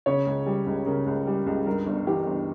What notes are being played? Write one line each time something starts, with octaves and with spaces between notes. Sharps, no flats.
C#3 C#5
C#2
G3
C#2
C#3 A#4
C#2
G3
C#2
G2 A#4
G1
E3 G4
G1